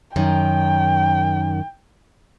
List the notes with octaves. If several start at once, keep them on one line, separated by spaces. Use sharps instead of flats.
F#2 D#3 G5